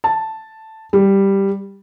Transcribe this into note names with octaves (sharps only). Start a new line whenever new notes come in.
A5
G3